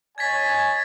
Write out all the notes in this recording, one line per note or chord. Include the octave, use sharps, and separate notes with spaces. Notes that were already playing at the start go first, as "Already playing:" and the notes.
C#5 D#5 G#5 G#6 A6 B6